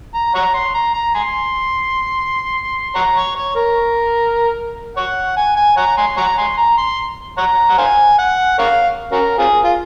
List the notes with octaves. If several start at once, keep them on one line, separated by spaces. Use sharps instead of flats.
A#5
C#5 F#5 A#5
C6
A#5
A#5
G#5 C6
C#5 F#5 A#5
C#5
C#5
A#4
C#5 F#5
G#5
G#5
C#5 F#5 A#5
G#5 C6
C#5 F#5 A#5
G#5 C6
A#5
C6
C#5 F#5 A#5
F#5
C5 F5 G#5
F#5
A#4 C#5 F5
C#4 F#4 A#4
C4 F4 G#4
F4